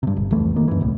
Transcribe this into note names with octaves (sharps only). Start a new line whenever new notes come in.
G2 C3
G1
C2 F2 E3 A3
D#3 A#3
F#2 E3
D#1 C2 A2